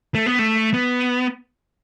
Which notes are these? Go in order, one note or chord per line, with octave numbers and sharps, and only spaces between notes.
A3
B3
A3
B3